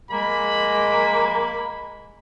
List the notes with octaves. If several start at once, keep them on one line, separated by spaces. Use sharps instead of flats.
G#3 A#3 B5